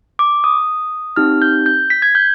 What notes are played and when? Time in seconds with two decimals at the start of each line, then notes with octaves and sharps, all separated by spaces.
0.19 D6
0.44 D#6
1.16 C4 D#4 G4 F6
1.42 G6
1.66 G6
1.90 B6
2.02 G#6
2.15 G6